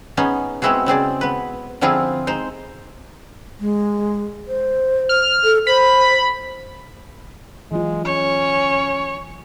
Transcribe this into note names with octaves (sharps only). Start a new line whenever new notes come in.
B3 C#4 D#4 G#4
G#3 B3 C4 E4 F#4 G#4
C#3 C4 G#4 D5
B3 B4
D3 F3 C4 E4 F4 G#4
G#3 D#4 C5
G#3
C5
F6
A4
C5 B5
E3 F#3 G#3 F4
C#4 C#5